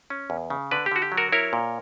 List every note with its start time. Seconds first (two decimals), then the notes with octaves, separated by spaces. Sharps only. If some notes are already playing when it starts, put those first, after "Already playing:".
0.10 C#4
0.30 E2
0.50 C#3
0.71 D3 B4 D5
0.86 G4
0.91 D3 F#4
1.02 G4
1.12 F#3
1.17 F#4 A#4
1.32 E4 A#4 C#5
1.53 A#2